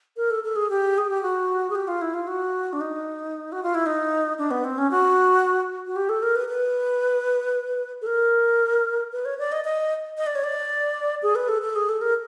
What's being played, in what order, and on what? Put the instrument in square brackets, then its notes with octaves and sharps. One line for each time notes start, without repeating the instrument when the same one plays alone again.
[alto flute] A#4
A4
A4
G#4
G4
G#4
G4
F#4
G#4
G4
F4
E4
F4
F#4
D4
D#4
F#4
F4
E4
D#4
D4
B3
C4
C#4
F#4
F#4
G4
A4
A#4
B4
B4
A4
A#4
B4
C#5
D5
D#5
D#5
D#5
D5
C#5
D5
G#4
B4
A4
A4
G#4
A4
A#4